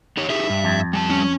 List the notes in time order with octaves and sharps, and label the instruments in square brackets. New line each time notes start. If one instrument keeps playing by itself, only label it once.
[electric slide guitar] D#4 G4 C#5
[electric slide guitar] D#4 G4 G#4 [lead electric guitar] E5
[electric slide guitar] G2
[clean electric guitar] F2
[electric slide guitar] G3 G#5 A5
[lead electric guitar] C#4